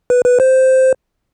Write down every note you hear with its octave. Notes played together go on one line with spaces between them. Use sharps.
B4
B4
C5